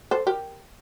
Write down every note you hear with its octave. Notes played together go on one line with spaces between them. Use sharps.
A4 C5
G4 A#4